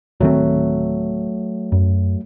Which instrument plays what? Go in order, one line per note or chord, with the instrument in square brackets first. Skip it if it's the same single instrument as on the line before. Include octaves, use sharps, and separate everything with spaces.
[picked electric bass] D1 D#3 C4 [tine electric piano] F#3 A3
[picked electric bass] F#2